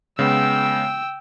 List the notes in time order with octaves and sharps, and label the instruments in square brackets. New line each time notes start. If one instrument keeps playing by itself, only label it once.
[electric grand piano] C#3 G#3 B3 [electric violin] G5 E6